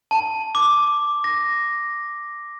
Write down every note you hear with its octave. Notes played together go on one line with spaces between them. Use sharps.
A5
D6
A#6